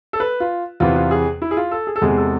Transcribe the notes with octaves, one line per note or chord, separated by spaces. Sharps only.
A4
B4
F4
E2 C3 E3 B3 F4
F4
G#4
E4
G#4
F4
A4
G#4
A4
E2 C3 G#3 G#4
A4